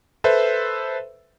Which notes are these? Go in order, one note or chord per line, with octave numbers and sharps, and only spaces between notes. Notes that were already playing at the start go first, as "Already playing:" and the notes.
A4 B4 C5 E5